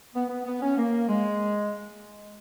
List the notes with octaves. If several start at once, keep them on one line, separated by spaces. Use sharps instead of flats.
B3
B3
B3
C#4
A#3
G#3